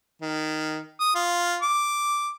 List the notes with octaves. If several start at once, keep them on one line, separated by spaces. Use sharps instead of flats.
D#3
D#6
F4
D6